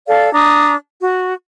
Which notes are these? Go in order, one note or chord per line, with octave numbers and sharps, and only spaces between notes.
A4 D5 F5
D4 A#5 D#6
F#4